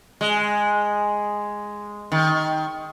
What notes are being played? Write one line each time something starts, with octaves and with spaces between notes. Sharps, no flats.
G#3
D#3